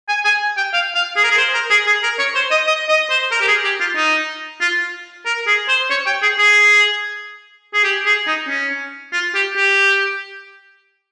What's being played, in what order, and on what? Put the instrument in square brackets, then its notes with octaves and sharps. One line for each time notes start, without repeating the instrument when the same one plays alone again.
[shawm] G#5
G#5
G5
F5
F5
G#4
A#4
G#4
C5
A#4
G#4
G#4
A#4
C#5
C5
D#5
D#5
D#5
C5
A#4
G4
G#4
G4
F4
D#4
F4
A#4
G#4
C5
C#5
G5
G#4
G#4
G#4
G4
G#4
D#4
C#4
F4
G4
G4